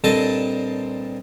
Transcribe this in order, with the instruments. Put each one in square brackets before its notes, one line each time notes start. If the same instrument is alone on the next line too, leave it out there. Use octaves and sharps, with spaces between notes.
[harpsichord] G2 A#2 C4 A4 D#5 A5